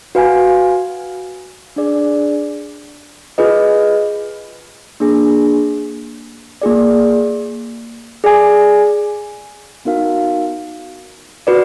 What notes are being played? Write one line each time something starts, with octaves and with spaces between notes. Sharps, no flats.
F#4 B4 F5 G#5
D4 G#4 D5
F4 G#4 B4 D#5
A#3 D4 G#4
A#3 F4 G#4 D5
G#4 D5 G#5
B3 D#4 F#4 A#4 F5
F#4 B4 D5